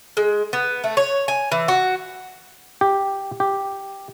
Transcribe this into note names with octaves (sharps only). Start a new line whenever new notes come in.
G#3
B3
A3
C#5
G#5
E3
F#4
G4
G4